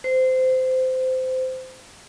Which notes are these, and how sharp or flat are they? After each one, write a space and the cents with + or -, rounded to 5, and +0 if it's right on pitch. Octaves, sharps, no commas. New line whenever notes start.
C5 -20